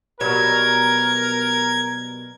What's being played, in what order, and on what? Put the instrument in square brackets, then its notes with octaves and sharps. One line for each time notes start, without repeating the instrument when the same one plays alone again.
[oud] B2 F#3 G3 [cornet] A#4 [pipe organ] G#6